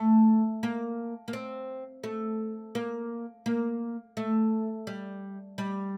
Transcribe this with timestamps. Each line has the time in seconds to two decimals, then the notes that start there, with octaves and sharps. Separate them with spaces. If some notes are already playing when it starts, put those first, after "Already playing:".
Already playing: A3
0.63 A#3
1.28 A#3
1.33 C4
2.04 A3
2.75 A#3
3.46 A#3
4.17 A3
4.87 G3
5.58 G3